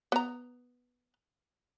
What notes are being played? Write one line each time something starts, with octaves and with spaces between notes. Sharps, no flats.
B3 A#5